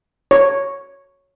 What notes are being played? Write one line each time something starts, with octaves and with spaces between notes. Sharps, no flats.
C#5